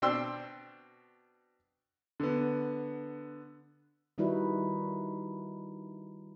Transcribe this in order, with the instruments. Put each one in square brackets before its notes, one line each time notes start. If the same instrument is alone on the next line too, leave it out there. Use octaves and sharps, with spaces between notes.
[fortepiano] B2 C4 D4 G5 C6 E6
[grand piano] D3 B3
[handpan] D#3 G3 D#4 E4 F#4 B4